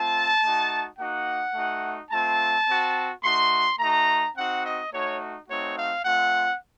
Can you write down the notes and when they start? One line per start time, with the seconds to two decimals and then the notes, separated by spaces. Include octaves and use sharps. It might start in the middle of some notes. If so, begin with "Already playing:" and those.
Already playing: A3 C4 F4 A5
0.42 A3 D#4 F#4
0.98 A#3 D#4 F#4 F#5
1.55 A3 D#4 F#4
2.11 A3 C4 F4 A5
2.67 C4 F#4
3.23 A3 D#4 F#4 C6
3.79 A3 D#4 F#4 A#5
4.35 C4 D#4 F#4 F#5
4.64 D#5
4.92 A3 D#4 F#4 C#5
5.48 A3 C4 D#4 F#4 C#5
5.76 F5
6.04 A3 C4 F4 F#5